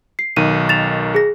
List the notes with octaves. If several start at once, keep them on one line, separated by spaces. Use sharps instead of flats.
C7
B1 D#3 D#7
A6 E7 F7
G#4 A#6